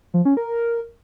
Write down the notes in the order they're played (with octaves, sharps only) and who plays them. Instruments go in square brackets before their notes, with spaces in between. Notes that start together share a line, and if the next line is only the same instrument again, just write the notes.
[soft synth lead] F3
C#4
A#4